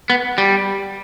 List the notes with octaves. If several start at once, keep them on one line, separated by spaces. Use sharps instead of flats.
B3
G3